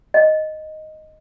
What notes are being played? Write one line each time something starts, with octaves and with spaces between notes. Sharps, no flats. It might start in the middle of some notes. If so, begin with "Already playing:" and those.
D#5